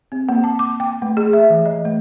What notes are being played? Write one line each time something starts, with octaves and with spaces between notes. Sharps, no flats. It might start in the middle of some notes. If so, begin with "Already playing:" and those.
C4
A#3
A5
D6
G5
A3
G#4
E5
E3
D#5
A3